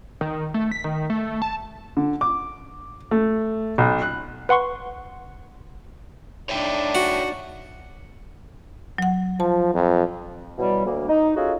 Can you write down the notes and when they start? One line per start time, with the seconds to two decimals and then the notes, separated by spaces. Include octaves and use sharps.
0.21 D#3
0.54 A3
0.71 B6
0.84 D#3
1.10 A3
1.42 A5
1.97 D3
2.21 D6
3.11 A3
3.78 B1
4.02 F#6
4.49 B4 F#5 C6 C#6
6.49 D4 D#4 C#5 E5 G5
6.95 F#4
8.98 F#3 F#5
9.40 F3 A5
9.74 F2
10.58 B2 E3 F#3 G3
10.85 D2 A#3
11.09 D#4
11.36 C#4 D#4 F4 F#4 G#4 A4